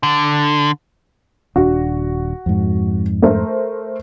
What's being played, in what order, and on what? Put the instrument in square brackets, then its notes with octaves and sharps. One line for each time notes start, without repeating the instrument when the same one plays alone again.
[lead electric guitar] D3
[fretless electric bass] D#1 D4 [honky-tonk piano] F#4
[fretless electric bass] F2 G#2
[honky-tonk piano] A3 A#4 C5